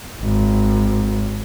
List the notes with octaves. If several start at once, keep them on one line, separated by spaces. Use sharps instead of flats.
G#1